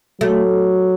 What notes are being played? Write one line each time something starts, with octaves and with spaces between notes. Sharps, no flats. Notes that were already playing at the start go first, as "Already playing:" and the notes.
F#3 A3